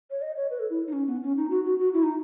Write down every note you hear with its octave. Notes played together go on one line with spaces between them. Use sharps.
C#5
D#5
C#5
B4
A4
E4
D#4
C#4
B3
C#4
D#4
F#4
F#4
F#4
E4
D#4